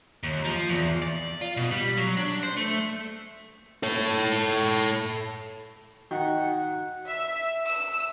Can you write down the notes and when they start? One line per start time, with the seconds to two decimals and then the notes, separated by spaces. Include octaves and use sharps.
0.23 D#2
0.45 F3
0.69 E2
1.02 D5
1.41 F4
1.57 B2
1.71 G3
1.98 F#3
2.17 D4
2.43 C5
2.57 A3
3.83 A4 C#5
6.11 D#3 F#4 F#5
7.10 E5
7.68 E6